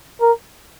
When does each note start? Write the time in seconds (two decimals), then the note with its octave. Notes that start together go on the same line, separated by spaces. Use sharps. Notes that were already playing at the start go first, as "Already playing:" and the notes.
0.21 A#4